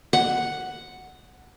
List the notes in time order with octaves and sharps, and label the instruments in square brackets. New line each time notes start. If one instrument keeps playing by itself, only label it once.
[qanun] F#5